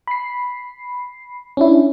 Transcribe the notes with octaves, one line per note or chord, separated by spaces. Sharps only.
B5 C7
C#4 D4 E4